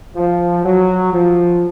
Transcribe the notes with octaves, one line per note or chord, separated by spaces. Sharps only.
F3
F#3
F3